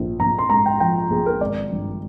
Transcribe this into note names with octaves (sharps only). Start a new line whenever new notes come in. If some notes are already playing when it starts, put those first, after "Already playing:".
Already playing: A#1
A#1 A#5
C6
G#2 A#5
G5
F3 G5
A#1 G#4
A#4
G#1 D5
G2